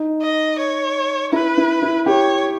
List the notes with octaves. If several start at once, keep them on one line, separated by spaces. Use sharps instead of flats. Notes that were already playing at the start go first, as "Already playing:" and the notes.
Already playing: D#4
D#5
C#5
E4 B4
E4
E4
G4 C#5